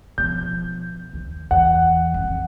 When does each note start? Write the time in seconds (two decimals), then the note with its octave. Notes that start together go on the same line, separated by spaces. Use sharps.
0.18 B2 F3 G6
1.13 D#2
1.51 E2 F#5
2.14 F1 A#1